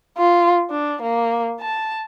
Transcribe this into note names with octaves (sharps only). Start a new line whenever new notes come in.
F4
D4
A#3
A5